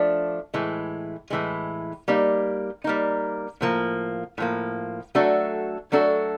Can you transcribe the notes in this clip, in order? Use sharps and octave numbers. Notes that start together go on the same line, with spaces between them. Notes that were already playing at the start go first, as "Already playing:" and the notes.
Already playing: F3 A3 D4
A2 E3 G#3
A2 E3 G#3
G3 A#3 D#4
G3 A#3 D#4
A2 F3 A#3
A2 F3 A#3
F#3 A3 D4 F#4 A4
F#3 A3 D4 F#4 A4